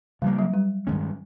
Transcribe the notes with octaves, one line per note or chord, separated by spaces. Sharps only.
C#3 F3 G3 A#3
F#3
G3
G2 D#3 G#3 C#4